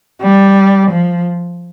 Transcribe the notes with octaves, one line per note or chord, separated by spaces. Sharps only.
G3
F3